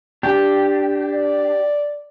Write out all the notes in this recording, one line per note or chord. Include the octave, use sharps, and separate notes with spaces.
D4 G4
D5